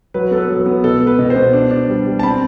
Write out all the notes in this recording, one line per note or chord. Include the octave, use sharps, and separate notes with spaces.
F#3 B4
B3 A4
B4
F#3
B4
B3
B2 A4
B3
B4
B2
C5
B2
D4
D4
G3
G3
A5
C4 B5